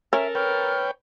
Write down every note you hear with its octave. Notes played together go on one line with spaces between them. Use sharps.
C#4 A4 A#4 E5
B4 C#5 G5 F6